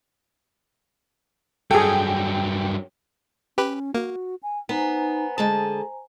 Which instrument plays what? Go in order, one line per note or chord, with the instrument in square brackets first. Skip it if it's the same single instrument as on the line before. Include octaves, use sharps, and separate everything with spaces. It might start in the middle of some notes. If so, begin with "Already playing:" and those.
[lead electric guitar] G2 F#3 [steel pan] G#4 A4 [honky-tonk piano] G5
[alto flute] C#4 [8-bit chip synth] G4 B4
[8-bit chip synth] A#3 [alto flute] F#4
[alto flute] G#5
[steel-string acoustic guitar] B3 [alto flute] D#4 [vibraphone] C5 G#5 A#5
[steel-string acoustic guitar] D3 G#3 A5 [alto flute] G#4